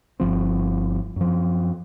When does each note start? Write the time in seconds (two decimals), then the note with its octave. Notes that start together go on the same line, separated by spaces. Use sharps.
0.20 G1 F2 F3 C4
1.16 F#2 F3